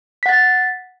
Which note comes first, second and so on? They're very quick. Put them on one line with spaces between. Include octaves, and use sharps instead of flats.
B6 F#5 A6